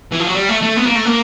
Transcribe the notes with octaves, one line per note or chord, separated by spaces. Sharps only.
E3
F3
F#3
G3
A3
A3
B3
A#3
A3
A#3